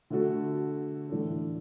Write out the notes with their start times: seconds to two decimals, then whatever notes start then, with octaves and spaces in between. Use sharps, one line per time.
0.10 D3 A3 F#4 A4
1.10 A2 E3 D4 A4